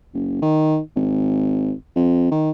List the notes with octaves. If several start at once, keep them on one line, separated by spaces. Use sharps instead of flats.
F#1
D#3
G#1
F2
D#3